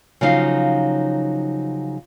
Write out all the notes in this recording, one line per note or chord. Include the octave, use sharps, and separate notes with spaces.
C#3 F3 F#3 D#4 F5